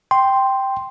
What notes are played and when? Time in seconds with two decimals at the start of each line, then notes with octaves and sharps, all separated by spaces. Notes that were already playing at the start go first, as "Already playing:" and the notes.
0.11 G5 C6